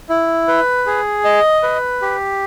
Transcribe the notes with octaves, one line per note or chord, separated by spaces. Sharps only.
E4
B4
G#4
D#5
B4
G4